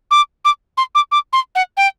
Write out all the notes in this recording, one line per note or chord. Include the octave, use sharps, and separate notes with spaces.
D6
D6
C6
D6
D6
C6
F#5
G5